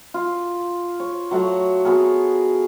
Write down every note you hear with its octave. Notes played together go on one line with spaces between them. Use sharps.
F4
C#5
F#3 A3 F#5 A#5
B3 F#4 G#4 A#4